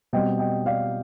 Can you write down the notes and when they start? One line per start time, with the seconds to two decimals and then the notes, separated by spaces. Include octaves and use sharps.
0.13 B2 G3 C4 D#5 G5
0.39 D#5 G5
0.66 D5 F5